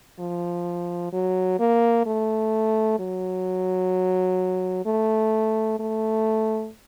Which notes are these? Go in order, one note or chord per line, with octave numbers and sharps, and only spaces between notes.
F3
F#3
A#3
A3
F#3
A3
A3